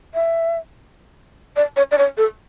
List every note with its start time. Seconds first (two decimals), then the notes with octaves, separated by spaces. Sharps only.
0.14 E5
1.56 D5
1.77 C#5
1.91 D5
1.98 C#5
2.17 A4